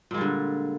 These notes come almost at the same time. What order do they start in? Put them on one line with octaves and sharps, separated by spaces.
A#2 G#3 G3 D3